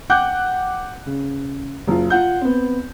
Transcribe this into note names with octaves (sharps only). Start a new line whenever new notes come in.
F#5 G5 D6 F#6 G6
C#3
F#1 F4
F4 F#5 G6
B3 C4